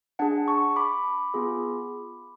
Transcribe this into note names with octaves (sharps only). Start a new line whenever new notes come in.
D4 G#4 F#5 A5
A5 C#6
B5 D6
B3 F4 G#4